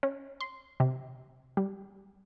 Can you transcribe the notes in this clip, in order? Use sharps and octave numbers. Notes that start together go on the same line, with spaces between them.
C#4
C6
C3
G3